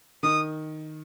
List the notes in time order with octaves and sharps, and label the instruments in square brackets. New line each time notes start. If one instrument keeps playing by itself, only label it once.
[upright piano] D#3 [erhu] D#6